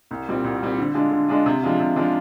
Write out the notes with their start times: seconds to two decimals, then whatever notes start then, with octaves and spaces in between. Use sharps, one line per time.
0.11 C2
0.27 A#2 G3 C4
0.44 C2
0.62 A#2 G3 C4
0.78 D3
0.94 G#3 D4 F4
1.11 D3
1.28 G#3 D4 F4
1.46 C3
1.63 F3 G#3 D4 F4
1.80 C3
1.96 F3 G#3 D4 F4